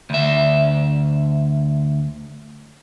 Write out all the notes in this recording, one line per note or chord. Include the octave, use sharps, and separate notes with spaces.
D2 E5